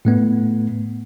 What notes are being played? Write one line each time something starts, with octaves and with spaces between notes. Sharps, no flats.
A2 A3 B3